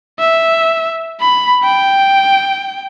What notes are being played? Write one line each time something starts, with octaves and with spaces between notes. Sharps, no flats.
E5
B5
G5